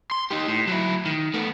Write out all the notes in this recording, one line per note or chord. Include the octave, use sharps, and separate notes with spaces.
C6
D#4 G4
A2
F#3 E4
D#3
A3 B3